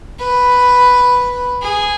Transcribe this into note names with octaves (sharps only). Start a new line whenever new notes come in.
B4
G#4